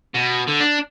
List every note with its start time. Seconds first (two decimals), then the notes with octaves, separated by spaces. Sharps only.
0.15 B2
0.48 D3
0.60 D4